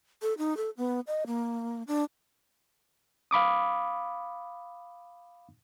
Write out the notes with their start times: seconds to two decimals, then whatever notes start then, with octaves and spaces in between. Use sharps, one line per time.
0.22 A4
0.38 D#4
0.57 A4
0.77 B3
1.07 D#5
1.27 A#3
1.87 D4
3.31 F5 B5 D6 D#6